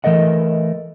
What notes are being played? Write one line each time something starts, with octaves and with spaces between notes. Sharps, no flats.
E3 A3 A#4 D#5 F#5